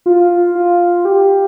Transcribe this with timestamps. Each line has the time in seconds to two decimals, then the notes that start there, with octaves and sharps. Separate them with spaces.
0.06 F4
0.55 F4
1.05 G4